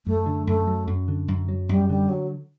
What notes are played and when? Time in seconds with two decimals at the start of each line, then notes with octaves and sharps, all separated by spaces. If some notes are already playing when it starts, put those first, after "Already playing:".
0.06 F#2 A3
0.26 D3
0.47 F#2 A3
0.67 F#3
0.87 F#2
1.08 D3
1.28 F#2
1.48 F#3
1.69 F#2 G3
1.89 D3 G3
2.09 F#3